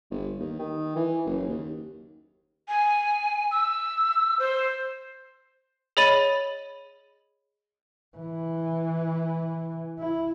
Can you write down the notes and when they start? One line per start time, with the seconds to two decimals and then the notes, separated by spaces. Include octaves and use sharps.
0.11 G1
0.39 D#2
0.59 D#3
0.96 E3
1.26 F#1
1.48 D#2
2.68 G#5
3.51 E6
4.39 C5
5.97 G#4 C#5 D#5 B5 A6 D#7
8.17 E3
9.99 E4